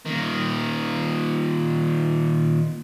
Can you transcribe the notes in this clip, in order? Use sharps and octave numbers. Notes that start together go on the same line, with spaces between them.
A#2 D#3